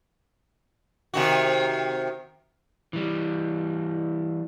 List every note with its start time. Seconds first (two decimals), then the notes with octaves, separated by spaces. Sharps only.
1.14 C3 D#3 F#4
2.93 E3 G3